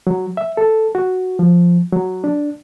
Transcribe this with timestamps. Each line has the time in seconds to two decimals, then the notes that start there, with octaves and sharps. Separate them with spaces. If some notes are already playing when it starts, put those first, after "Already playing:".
0.07 F#3
0.37 E5
0.57 A4
0.95 F#4
1.39 F3
1.92 F#3
2.24 D4